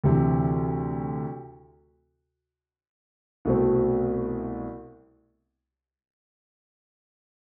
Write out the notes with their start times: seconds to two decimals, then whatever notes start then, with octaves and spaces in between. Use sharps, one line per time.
0.04 D2 C3 E3
3.45 C2 B2 A3 C4